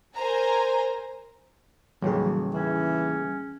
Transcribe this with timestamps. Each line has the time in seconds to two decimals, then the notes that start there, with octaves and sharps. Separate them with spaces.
0.16 A#4 C5 G#5 A#5
2.02 A1 D#2 C#3 F#3 G3 G#4
2.53 E3 C#4